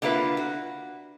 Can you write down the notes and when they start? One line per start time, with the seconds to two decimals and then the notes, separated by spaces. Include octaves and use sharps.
0.02 D3 A#3 E4 F4 B4
0.37 F#4